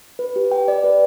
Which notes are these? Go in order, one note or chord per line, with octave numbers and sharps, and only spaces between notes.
B4
G4
G5
D5
B4